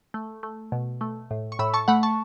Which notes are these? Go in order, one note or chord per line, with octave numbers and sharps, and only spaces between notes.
A3
A3
B2
A3
A2
C#6
A2 B5 E6
A5 C#6
A3 F#5 B5
A5 C#6